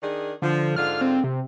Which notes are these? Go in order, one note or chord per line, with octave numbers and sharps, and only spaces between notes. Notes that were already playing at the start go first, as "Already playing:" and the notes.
D#3 D4 G#4
D3 F3
G#2 D3 F4 F6
C4
C3